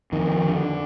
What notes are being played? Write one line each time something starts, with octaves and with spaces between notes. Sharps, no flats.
F2 D#3
D3